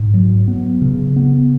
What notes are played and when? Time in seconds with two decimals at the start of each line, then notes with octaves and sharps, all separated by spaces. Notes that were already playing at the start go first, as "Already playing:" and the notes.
Already playing: G#2
0.14 F#3
0.48 B3
0.82 C#3
1.16 B3